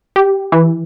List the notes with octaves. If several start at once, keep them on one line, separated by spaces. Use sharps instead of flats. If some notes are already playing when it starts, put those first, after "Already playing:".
G4
E3